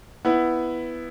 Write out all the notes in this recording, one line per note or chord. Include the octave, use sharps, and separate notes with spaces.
B3 E4